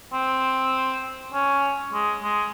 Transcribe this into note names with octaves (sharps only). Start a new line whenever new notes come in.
C4
C#4
G#3
G#3